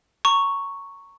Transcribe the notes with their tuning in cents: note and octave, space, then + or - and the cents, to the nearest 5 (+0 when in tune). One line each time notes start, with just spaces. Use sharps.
A#5 -20 C#6 +0